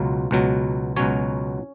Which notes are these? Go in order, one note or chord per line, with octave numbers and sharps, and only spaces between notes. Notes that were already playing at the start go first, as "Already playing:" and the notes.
Already playing: C#2 B2 F#3 F4
C#2 B2 F#3
C#2 B2 F#3 C#4 C#5